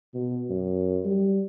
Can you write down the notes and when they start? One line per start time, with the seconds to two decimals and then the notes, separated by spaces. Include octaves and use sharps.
0.14 B2
0.50 F#2
1.05 G3